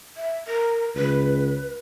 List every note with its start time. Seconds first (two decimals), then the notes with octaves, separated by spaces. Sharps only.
0.17 E5
0.47 A#4
0.95 C#2 B4